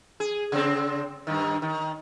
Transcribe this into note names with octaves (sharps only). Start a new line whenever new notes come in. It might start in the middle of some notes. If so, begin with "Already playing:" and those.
G#4
C#3 C4
G2 D#3
D#3